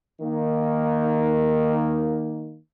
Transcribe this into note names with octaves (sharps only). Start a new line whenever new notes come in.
D#3 A#3